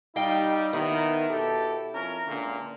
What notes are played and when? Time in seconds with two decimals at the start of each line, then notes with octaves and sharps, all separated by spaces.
0.16 G3 D#4 D#5 F5 G5
0.73 D#3 B3 E4
1.29 B2 G4 A4
1.93 F2 C#4 A#4
2.27 C#2 A#2 D3